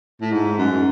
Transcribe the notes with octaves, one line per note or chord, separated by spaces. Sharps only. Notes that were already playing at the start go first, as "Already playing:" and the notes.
A2
G#2
F#2